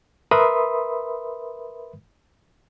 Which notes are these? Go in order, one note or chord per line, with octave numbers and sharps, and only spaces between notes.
A#4 B4 E5 B5 C6 D#6